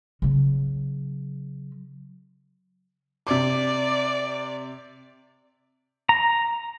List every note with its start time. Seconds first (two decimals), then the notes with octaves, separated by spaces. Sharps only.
0.22 C#3 F#3
3.27 C3 D5 D6
6.09 A#5